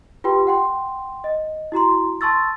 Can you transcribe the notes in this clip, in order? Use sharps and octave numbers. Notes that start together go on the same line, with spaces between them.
F4 G4 B4 G5 C6
F#5 G5 C6
D#5
E4 F#4 A#5 C6
A5 C6 C#6 E6 A6